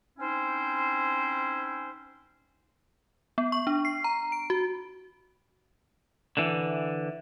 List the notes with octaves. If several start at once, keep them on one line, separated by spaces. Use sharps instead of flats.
C4 C#4 D#4 E4 C5
B3
C#6
D4
C7
A#5
D7
F#4
D3 E3